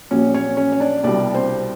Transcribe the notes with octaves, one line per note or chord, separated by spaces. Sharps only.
A#1 A#2 F#3 C#4 C#5
C#4 C#5
C#4 C#5
C#5
D4 D5
C2 B2 G3 D4 D5
C4 C5